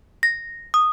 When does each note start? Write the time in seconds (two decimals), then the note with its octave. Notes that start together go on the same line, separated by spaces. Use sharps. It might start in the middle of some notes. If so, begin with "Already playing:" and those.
0.23 A#6
0.74 D#6